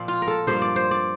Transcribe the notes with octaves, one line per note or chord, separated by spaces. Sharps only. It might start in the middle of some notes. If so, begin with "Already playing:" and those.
Already playing: A#2 F3 C4
F4
A#4
A4
G2 F3 A#3 C5
D5
C5
D5